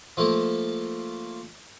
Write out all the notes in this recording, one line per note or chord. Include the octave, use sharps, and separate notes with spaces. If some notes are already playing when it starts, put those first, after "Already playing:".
F3 A3 A#3